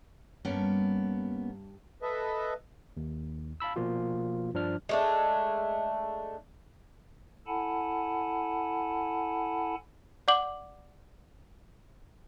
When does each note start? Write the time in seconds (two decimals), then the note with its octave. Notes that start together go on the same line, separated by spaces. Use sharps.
0.45 G2 A#3 B3 C#4
2.02 A4 B4 D#5 E5
2.97 D#2
3.60 F5 A5 B5 E6
3.76 B2 F3 A#3 F4 F#4
4.54 G2 F3 D4 F6
4.89 G#3 A3 D4
7.47 E4 A4 F#5 G#5 A5 B5
10.28 D5 F#5 D6 F#7